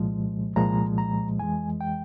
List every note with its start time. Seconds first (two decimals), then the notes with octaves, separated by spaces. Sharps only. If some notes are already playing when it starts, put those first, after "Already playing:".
Already playing: C2 A#2 F3 G#3
0.56 C2 A#2 F3 G#3 A#5
0.98 A#5
1.39 F2 E3 G#3 G#5
1.81 G5